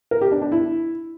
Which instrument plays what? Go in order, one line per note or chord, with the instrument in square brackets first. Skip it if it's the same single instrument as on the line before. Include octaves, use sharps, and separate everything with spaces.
[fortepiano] A#4
G4
D4
D4
E4